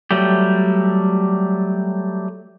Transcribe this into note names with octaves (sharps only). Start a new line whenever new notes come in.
F#3 G3 A3 G4